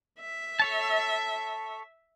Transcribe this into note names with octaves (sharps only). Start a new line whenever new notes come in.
E5
A4 C#5 A5